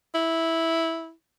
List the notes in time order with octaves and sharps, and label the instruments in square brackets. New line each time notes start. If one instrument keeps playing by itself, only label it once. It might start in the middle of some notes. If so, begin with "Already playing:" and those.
[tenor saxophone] E4